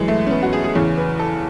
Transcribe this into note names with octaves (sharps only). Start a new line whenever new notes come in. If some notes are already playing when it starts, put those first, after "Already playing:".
Already playing: F#2 E3 G#3
A3
C#4
B3
F#4
G#4
G#4
E2 C#3 E3 C#5
B4
A4